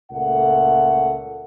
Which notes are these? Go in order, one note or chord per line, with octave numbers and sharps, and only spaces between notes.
C#2 A#2 A3 A4 F#5